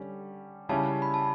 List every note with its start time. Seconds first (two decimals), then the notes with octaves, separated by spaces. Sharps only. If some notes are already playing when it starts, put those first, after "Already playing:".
Already playing: D3 G3 C#4
0.69 C#3 G3 C#4 E4 A5
1.02 B5
1.14 A5